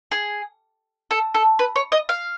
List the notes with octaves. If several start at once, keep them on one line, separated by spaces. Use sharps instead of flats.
G#4
A4
A4
B4
C#5
D#5
F5